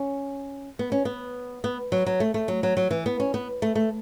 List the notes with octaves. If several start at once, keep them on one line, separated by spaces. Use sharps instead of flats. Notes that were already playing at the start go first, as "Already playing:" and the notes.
Already playing: C#4
B3
C#4
B3
B3
F#3
F#3
A3
A3
F#3
F#3
F#3
E3
B3
C#4
B3
A3
A3